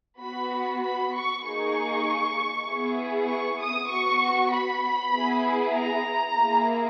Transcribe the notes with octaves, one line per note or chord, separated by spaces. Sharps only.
B3 F#4 B5
B5
C#6
A#3 D#4 G#4 C#6
B3 E4 G#4
C#6
D#6
B3 F#4 C#6
B5
B3 E4 G#4
A#5
A#3 E4 G#4